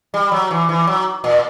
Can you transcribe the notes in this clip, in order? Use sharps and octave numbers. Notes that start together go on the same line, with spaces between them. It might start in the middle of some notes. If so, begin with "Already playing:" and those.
G3
F#3
E3
E3
F#3
A#2